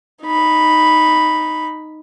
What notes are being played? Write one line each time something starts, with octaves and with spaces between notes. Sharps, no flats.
D#4 B5